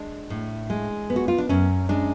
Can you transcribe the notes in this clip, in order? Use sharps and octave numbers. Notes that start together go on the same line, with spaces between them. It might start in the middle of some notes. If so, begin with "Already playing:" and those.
Already playing: G#3 D4
A2
G#3
B3
F#4
F4
D4
F#2 C#4
G#3 D4